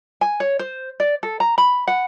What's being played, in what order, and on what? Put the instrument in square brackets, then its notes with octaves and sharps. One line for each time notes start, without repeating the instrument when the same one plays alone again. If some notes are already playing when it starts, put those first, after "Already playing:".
[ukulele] G#5
C#5
C5
D5
A4
A#5
B5
F#5